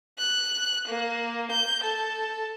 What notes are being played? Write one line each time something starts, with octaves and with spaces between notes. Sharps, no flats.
F#6
A#3
G6
A4